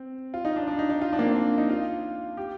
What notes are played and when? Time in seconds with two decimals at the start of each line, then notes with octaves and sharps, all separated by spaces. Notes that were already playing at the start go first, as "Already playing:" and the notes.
Already playing: C4
0.34 F4
0.45 D#4
0.56 D4
0.68 D4
0.79 D#4
0.90 D#4
1.01 F4
1.13 D4
1.19 A#3
1.25 C4
1.35 D4
1.58 D#4
1.70 F4
2.37 G4